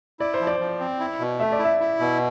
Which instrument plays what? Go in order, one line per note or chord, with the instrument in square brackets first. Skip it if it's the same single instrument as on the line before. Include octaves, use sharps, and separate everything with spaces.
[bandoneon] E4 [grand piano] D5
[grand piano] C5
[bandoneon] F3
[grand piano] D5
[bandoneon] F3
C4
E4
B2
[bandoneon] A3 [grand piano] E5
[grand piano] D5
[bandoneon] E4
[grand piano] E5
[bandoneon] E4
B2